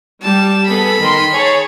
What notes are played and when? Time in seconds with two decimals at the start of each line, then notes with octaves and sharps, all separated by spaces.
0.23 G3 A5
0.67 B3 G#4 A4 B5
1.00 D#3 C6
1.32 G#4 C#5 A5